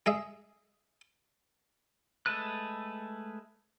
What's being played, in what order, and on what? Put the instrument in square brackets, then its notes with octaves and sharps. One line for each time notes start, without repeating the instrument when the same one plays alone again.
[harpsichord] G#4 D#5 E5
[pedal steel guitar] G#3 A3 A4 B4 F#6